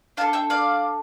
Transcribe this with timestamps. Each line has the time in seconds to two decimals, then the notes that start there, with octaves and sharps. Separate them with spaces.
0.17 D4 F5 A5
0.21 A4
0.33 E5 G5
0.50 D5 F5